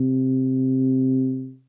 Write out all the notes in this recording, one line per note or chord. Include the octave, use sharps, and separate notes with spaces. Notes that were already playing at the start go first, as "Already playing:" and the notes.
Already playing: C3